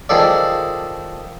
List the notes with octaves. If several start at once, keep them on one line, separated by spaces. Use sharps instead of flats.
D#3 F3 G#4 A4 D5